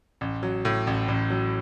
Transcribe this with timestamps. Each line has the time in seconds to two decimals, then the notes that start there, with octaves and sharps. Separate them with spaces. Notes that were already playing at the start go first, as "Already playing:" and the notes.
0.21 A1
0.43 F#3
0.65 A2
0.87 A1
1.08 A1
1.30 F#3